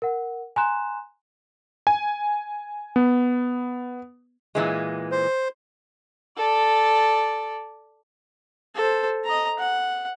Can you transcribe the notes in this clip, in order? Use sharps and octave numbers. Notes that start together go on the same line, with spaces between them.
A#4 F#5
G#5 A#5 C6 F#6 E7
G#5
B3
A#2 E3 G#3
C5
A4 D5
A4 C5
D#5 A#5
F#5